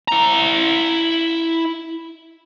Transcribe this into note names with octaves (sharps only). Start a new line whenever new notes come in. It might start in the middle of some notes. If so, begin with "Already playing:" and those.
E4 A#5